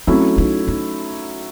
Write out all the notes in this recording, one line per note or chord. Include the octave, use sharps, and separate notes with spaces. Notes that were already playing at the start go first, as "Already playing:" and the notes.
F#3 A3 C4 C#4 E4
D#4
D#4